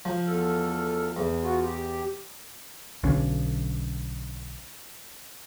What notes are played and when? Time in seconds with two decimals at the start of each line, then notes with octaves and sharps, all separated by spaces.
0.05 F3
0.27 E2 A4 F6
1.16 E2
1.43 F4 F#4
1.64 G4
3.03 B1 D3 C#4